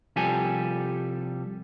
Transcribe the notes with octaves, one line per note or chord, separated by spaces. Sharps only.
C2 F3 G3 G4 A4 G#5